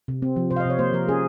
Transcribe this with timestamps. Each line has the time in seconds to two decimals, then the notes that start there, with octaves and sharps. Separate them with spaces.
0.08 C3
0.22 C4
0.36 F3
0.50 C3 C5
0.56 F5
0.60 D#5
0.65 C3 C#5
0.79 A#3 C5
0.93 F3 A#4
1.09 C#4 G#4